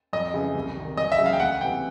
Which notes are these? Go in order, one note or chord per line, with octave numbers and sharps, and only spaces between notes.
F2 D#5
C#3 E3
C2
C3 D#3
E2 D#5
E5
C#3 F#3
F5
G5
D2 F#5
C3 E3 G5